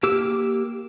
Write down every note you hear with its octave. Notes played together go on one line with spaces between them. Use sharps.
A#3 G4 D6 E6